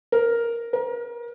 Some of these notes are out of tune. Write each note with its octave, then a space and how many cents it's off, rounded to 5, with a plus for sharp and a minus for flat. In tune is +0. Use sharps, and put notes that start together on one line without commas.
A#4 +0
A#4 +30